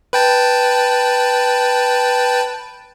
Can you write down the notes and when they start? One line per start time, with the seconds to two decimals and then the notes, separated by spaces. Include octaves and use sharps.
0.13 B4 G5 A5